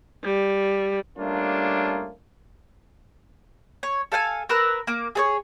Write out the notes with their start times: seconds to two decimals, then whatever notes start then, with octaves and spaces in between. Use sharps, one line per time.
0.24 G3
1.18 G3 A3 A#3 C#4 D4 F4
3.83 C#5
4.12 A4 F5 G5 G#5
4.49 A#4 B4 E6 F#6
4.87 A#3 D6
5.15 G#4 A4 C#5